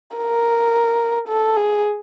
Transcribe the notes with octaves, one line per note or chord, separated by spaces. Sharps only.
A#4
A4
G#4